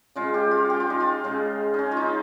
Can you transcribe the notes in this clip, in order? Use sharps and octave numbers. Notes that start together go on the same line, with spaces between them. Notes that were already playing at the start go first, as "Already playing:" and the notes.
C#3 G#3 F4
G4
F4
G4
F4
D#4
F4
C#3 G#3
C#4 D#4
F4
D#4